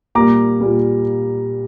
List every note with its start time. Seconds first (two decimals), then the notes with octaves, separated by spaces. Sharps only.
0.15 A#2 G3 A#3 A#5 D6
0.60 A#2 G3 A#3